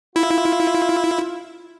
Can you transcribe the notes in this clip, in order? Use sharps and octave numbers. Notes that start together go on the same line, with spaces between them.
E4 F4